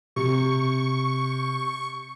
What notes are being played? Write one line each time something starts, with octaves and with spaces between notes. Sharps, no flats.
C3 C#6